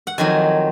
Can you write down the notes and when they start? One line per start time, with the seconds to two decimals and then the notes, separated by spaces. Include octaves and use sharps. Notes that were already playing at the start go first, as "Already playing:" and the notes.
0.07 F#5
0.18 F2 D#3 F#3 G#5